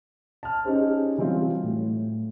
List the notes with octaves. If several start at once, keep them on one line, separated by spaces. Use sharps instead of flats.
A5 F6
C#4 D#4 G4 G#4 C5
E3 F#3 G3 C4 F4
A2